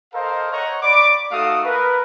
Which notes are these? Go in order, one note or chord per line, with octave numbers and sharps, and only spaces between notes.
A4 A#4 C5 D#5 F5
C#5 D#5 F#5 A#5 C#6
D5 B5 D6
A3 D#4 F#4 A4 F5 D#6
A#4 B4